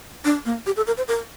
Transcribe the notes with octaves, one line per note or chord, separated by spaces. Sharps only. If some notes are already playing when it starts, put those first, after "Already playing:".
D4
A#3
G4
A4
A#4
C5
A#4